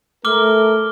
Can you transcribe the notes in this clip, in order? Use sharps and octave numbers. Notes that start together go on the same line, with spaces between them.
A3 A#4 D6 F6 G7